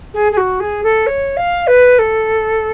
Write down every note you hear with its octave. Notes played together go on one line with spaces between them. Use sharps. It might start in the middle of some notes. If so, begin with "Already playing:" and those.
G#4
G#4
F#4
G#4
A4
C#5
F5
B4
A4